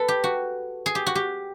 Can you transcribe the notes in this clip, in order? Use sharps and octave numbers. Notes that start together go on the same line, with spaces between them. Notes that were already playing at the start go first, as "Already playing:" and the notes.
Already playing: A4 B4
G4
F#4
G#4
G4
F#4
G4